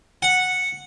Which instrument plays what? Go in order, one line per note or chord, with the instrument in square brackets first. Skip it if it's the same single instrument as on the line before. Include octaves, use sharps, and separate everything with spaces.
[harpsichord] F#5